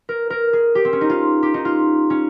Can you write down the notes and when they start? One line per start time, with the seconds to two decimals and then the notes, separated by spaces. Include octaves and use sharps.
0.09 A#4
0.30 A#4
0.53 G#4
0.75 G4
0.85 C4
0.93 C#4
1.01 D#4
1.10 F4
1.43 G4
1.54 D#4
1.65 F4
2.10 C#4